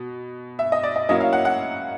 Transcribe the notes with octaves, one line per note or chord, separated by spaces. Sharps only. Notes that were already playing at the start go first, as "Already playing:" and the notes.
Already playing: B2
E5
D#5
D5
D#5
F#3 A#3 C#4 E4 D#5
F5
F#5
F#5